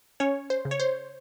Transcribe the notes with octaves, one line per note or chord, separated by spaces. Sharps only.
C#4 C#5
C5
C#3
C#5
C5